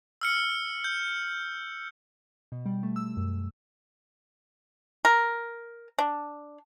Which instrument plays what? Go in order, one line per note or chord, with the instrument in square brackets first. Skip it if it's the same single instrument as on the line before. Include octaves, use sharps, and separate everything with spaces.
[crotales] E6 F6 C#7
G6
[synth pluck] B2
G3
A3
E6
F#2
[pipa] A#4
D4